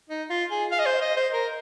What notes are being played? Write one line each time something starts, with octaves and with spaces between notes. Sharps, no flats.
D#4
F4
G#4
F5
D#5
C5
D#5
C5
A#4